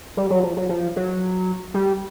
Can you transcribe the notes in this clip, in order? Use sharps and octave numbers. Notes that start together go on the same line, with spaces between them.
G3
F#3
F3
F#3
F3
F#3
G3